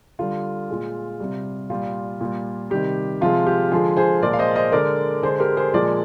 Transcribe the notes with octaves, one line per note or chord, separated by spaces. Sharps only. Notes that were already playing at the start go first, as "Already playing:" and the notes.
D3 G3 F4
A#2 G#3
C3 G3
A#2 G3 F4
A#2 G3
C3 D#3 G3 G4
C3 F3 G#3 F4
G4
D3 F3 G#3 F4 G#4
G#4 C5
A#2 F3 G#3 A#4 D5
F5
C5 D#5
C5 D#5
D3 G#3 A#4 D5
D3 G#3 G#4 C5
G4 A#4
G#4 C5
A#2 F3 G#3 A#4 D5